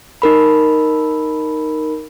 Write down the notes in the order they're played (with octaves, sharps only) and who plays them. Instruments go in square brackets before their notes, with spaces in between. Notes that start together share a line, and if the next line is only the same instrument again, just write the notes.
[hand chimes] D#4 A#4 B5